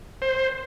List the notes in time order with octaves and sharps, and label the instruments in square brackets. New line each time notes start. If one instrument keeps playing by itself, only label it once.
[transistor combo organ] C5